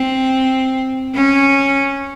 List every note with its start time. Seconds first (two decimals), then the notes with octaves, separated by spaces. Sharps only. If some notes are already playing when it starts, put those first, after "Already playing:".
Already playing: C4
1.14 C#4